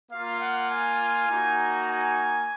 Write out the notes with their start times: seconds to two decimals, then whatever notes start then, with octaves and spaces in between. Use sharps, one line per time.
0.10 A#3 F4 F5
0.41 F#5
0.69 G#5
1.29 A#3 D#4 F#4
1.87 G#5